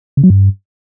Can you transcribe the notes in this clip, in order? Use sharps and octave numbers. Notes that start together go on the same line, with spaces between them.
C#3
F#3
G2